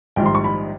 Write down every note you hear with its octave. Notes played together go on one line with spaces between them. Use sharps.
A#1 G#2 D#3 G3 G5
C6
C#6
B5